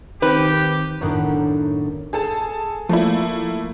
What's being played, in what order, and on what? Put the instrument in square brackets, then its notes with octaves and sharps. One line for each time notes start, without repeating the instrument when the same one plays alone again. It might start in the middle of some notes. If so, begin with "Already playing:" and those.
[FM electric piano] D#3 C4 [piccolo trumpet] G4 [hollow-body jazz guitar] B4
[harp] F#2 A2 D#3 B3 D4 D#4
[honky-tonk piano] G#4 A4 A5
[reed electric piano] F3 [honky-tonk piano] A3 A#3 E4